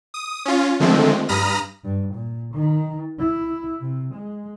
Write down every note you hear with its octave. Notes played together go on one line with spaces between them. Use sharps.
D#6
C#4 F4
D3 D#3 F3 G#3 A3 C4
G2 A#5 B5 D#6 F6 A#6
G2
A#2
D#3
E4
C3
G#3